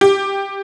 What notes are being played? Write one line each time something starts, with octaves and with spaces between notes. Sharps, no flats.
G4